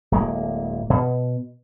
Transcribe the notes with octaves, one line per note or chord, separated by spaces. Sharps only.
D1 G#3 A#3
B2